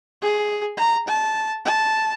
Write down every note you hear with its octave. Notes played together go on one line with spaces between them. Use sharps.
G#4
A#5
A5
A5